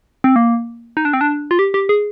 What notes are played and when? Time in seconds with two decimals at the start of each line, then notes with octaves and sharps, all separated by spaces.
0.24 C4
0.36 A#3
0.97 D#4
1.05 D4
1.13 C4
1.21 D4
1.51 F4
1.59 G4
1.74 G4
1.89 G#4